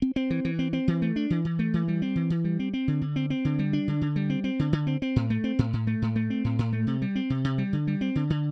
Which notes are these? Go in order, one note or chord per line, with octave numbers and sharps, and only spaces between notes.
C4
C4
E3
E3
C4
C4
E3
A3
D4
E3
E3
A3
E3
G3
C4
E3
E3
G3
C4
C4
D3
D3
C4
C4
D3
G3
D4
D3
D3
G3
C4
C4
D3
D3
C4
C4
A2
A3
C4
A2
A2
A3
A2
A3
C4
A2
A2
A3
C3
G3
C4
C3
C3
G3
D3
G3
C4
D3
D3